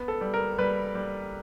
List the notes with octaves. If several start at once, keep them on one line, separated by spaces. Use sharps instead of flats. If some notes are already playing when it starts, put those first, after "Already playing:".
Already playing: B3
A4
G3
A#4
G3 B4
G3